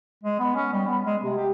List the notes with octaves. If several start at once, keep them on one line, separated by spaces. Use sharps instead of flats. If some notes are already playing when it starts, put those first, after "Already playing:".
G#3
B3
C#4
G3
B3
G#3
C3
G4